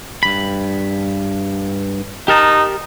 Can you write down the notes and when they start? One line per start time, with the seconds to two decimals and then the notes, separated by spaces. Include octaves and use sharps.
0.23 G2 B5
2.28 D#4 G4 A#4 A5